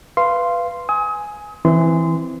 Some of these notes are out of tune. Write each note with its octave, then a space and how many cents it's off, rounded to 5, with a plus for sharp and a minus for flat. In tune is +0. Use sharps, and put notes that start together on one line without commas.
B4 +0 F5 -20 C6 +0
G#5 +0 D#6 +35
E3 +0 C4 +0 C6 -25